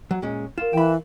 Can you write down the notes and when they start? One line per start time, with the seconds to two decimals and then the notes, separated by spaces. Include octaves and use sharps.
0.11 F#3
0.22 A#2 G#3 C#4
0.58 F4 A#4 F5 E7
0.73 E3 G5 B5